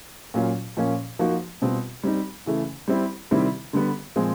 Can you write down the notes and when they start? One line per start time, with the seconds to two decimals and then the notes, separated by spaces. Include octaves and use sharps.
0.34 A#2 F#3 A#3 C#4 F4
0.77 A#2 F3 A#3 C#4
1.19 F3 A#3 D#4 F#4
1.62 B2 G3 C4 F4
2.03 G3 C4 D#4
2.46 C#3 E3 A3
2.88 G3 C4 E4
3.31 C3 D#3 G3 C4 E4
3.73 D3 G3 B3
4.16 A#2 F3 G#3 C4